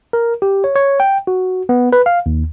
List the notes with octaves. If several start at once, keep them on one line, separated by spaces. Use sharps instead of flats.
A#4
G4
C#5
C#5
G5
F#4
B3
B4
F5
D#2